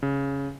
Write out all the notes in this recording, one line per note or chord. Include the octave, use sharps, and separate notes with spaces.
C#3